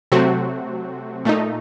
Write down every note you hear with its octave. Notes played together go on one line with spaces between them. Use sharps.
C3 F#3 A3 C4 F#4
A#2 A3 D#4